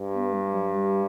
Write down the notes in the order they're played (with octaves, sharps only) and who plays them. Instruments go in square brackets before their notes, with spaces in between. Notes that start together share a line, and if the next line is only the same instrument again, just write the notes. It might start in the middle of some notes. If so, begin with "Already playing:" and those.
Already playing: [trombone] G2
[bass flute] B3
G3
F#3
G3